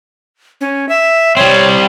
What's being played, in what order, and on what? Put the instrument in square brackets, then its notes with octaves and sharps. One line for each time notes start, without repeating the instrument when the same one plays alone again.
[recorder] C#4
E5
[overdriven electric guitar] G3 C4 [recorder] C#5